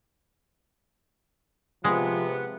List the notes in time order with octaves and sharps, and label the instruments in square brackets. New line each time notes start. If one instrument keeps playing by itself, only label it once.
[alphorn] C3 [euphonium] F3 [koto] G#3 [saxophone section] B3